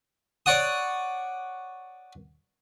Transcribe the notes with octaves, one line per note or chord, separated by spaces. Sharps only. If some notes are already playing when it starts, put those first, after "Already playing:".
C#5 D5 F#5 D#6